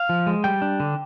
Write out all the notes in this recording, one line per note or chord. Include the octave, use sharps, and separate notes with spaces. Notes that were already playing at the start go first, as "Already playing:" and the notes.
Already playing: F5
F3
G#3
G3 G5
D4
D3